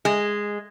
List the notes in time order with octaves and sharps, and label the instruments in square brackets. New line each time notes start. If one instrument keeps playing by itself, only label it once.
[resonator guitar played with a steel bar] G#3